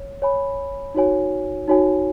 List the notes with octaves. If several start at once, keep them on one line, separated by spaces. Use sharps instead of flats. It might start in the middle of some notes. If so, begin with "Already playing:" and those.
Already playing: C#5
C#5 G#5 B5
D#4 F#4 C#5 G#5
D#4 F#4 C#5 G#5